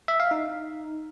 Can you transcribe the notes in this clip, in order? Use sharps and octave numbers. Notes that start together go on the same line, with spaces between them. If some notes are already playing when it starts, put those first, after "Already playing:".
E5
F5
D#4